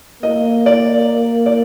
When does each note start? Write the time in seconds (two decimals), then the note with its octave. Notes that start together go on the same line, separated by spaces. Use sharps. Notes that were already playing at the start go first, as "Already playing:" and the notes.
0.23 A#3 D#5
0.66 D5
1.46 D5